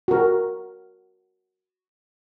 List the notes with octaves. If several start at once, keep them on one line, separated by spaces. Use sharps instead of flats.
F#4 A#4